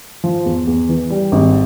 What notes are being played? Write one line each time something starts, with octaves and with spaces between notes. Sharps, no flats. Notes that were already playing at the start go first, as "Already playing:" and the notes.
F3
E2
E2
E3
G3
G#1